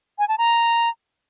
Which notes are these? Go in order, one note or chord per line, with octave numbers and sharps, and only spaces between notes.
G#5
A5
A#5